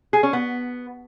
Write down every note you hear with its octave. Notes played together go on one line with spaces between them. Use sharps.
G#4
C#4
B3